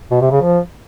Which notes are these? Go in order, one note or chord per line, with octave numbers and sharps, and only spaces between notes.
B2
C3
C#3
F3